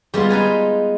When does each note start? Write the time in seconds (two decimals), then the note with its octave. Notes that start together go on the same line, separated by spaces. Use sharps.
0.14 G3 G#3 B3 F4
0.30 D#4 B4 G#5